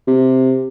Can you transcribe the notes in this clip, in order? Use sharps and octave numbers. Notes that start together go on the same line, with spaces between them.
C3